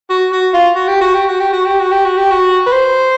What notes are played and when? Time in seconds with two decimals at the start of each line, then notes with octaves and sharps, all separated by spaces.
0.10 F#4
0.32 F#4
0.54 F4
0.75 F#4
0.88 G4
1.01 F#4
1.15 G4
1.28 F#4
1.40 G4
1.53 F#4
1.66 G4
1.79 F#4
1.92 G4
2.05 F#4
2.17 G4
2.31 F#4
2.66 B4
2.73 C5